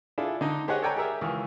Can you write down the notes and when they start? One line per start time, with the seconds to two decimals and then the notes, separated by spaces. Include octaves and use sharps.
0.18 D4 E4 F4 G#4 A4
0.41 D3 D#4
0.68 G4 G#4 C5 C#5 D#5 F#5
0.82 A4 C#5 D5 G5 G#5 A#5
0.96 G4 G#4 A#4 E5
1.21 C#2 D#3 E3